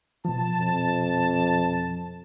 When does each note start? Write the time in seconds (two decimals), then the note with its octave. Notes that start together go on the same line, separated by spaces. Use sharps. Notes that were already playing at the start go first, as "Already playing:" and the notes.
0.25 B2 F3 A5
0.61 F2